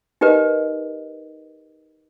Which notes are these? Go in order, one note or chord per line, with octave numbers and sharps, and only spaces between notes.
D#4 G4 A#4 B4 D#5